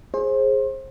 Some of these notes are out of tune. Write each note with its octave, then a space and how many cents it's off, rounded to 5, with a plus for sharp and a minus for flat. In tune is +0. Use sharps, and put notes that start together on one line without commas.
G#4 +0 C5 +30